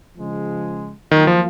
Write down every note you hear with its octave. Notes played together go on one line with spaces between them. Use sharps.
C#3 F3 G#3
D#3 F#3 A#3 F4
F3